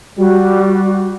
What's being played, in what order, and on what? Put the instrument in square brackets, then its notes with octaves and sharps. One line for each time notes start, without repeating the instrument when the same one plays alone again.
[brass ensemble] G3 [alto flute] F#4